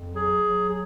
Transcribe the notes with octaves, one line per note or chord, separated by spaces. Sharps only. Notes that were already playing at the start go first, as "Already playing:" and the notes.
Already playing: F2
F#3 G#4
F#3
G#4